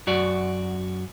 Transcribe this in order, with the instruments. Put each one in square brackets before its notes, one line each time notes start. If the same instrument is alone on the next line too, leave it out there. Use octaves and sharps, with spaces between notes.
[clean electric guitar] F#2 F#4 D5